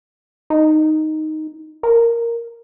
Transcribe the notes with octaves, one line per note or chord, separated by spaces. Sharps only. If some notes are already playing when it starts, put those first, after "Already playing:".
D#4
A#4